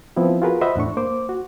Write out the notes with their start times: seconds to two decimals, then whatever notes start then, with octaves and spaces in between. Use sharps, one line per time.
0.16 F3 B3 C4 E4
0.42 F4 F#4 G#4 A#4 B4
0.61 C5 D#5 E5 F#5 B5
0.76 E2 A2 D4 C#6
0.97 A#3 C5 D6
1.29 F#4